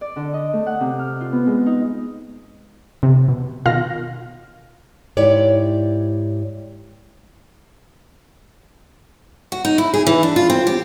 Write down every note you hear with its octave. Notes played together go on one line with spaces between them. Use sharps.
D5
D3
D#5
A3
F#5
C3
F6
F4
B3
G#3
D#4
C3
B2
B2 D#3 F4 F5 F6 A#6
G#2 E4 G4 C#5 D5
F#4
D#4
E4
G#4
E3
D4
F4
C4
G4